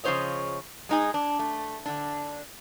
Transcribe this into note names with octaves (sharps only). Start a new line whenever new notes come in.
C#3 F3 C4 C5 C#5 D#5
G#3 D#4 G#4
D4
A3
D3 D4